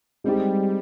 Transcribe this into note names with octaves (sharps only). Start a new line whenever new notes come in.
G3 G#3 C4 D#4 G4